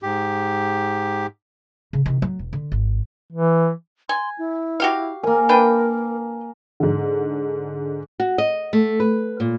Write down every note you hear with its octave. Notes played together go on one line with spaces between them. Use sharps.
G#2 G4
C#3
C3 D#3
F#3 A3
E1
D3
G#1
E3
G#5 C6
E4
F#4 G4 F5
A#3 A#4 G#5
D4 B4 G5
G#2 D3
F#4
D#5
A3
B4
A#2